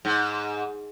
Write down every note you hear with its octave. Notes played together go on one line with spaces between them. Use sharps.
G#2